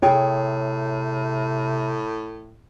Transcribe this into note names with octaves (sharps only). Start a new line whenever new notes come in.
A2 C3 G#4 C#5 G5